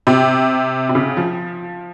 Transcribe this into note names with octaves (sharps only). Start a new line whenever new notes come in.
C3
C3
C#3
F3